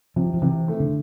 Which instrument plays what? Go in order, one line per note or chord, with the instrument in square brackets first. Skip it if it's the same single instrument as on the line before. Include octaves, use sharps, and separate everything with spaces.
[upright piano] C3 [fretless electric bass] F3
[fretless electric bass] F3
[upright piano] C3 [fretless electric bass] E3
[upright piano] A3
[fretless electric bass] D3